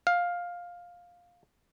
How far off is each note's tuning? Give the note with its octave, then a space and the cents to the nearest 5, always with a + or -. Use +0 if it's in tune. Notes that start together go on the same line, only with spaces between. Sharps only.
F5 +10